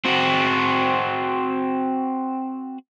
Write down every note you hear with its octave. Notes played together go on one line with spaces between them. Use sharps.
C4 F#4